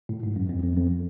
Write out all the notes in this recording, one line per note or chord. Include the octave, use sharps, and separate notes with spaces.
A2
G#2
F#2
F2
F2
F2